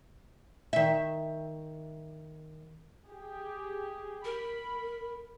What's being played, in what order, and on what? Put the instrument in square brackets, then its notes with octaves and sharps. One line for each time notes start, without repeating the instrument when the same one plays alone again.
[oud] D#3 E5
[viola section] G4 G#4
[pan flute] A#4 [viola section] B5